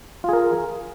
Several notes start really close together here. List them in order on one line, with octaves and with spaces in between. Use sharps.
F4 G#4 A#4